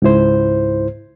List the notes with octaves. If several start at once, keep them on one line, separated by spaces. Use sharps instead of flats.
C#2 G#2 E4 C5